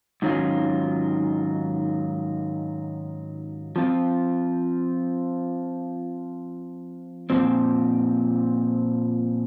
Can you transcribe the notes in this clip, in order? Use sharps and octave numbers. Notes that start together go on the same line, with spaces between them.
G#2 D#3 F#3 C#4 F4
F3 C4 F4
A#2 F3 C4